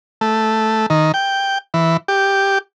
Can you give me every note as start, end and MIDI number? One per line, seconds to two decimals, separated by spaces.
0.21 0.86 57
0.90 1.12 51
1.14 1.58 79
1.74 1.97 52
2.08 2.58 67